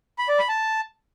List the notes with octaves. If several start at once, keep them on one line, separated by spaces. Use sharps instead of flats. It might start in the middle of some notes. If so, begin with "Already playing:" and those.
B5
D5
B5
A5